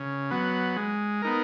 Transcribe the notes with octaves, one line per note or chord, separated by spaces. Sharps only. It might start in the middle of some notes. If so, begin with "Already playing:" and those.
Already playing: C#3
F#3 B3
G#3
B3 D#4 A#4